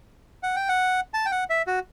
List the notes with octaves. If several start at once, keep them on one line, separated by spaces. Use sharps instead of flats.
F#5
G5
F#5
A5
G5
F#5
E5
F#4